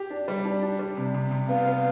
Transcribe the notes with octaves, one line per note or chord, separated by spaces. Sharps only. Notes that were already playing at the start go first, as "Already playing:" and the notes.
Already playing: G4
D4
G3
D4
D4
G3
C3
C3
C3
B3 F5
B3